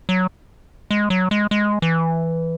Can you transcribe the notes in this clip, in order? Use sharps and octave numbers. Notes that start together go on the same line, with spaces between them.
F#3
G#3
F#3
G#3
G#3
E3